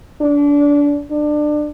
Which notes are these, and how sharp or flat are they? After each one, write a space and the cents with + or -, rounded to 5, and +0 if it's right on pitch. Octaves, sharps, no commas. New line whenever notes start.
D4 -25
D4 +25